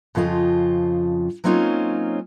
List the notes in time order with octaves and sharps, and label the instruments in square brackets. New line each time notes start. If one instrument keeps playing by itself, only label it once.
[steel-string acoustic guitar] F2 C#3 F3 F4 D#5
F#3 A#3 C4 C#4 D#4 F4